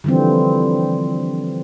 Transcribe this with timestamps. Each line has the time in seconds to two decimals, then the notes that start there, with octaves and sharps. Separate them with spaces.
0.04 D3 E3 F3 G3 C4